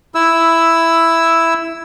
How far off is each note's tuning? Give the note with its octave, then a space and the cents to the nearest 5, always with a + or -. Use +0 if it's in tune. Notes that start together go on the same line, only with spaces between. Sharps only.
E4 +5 E6 +0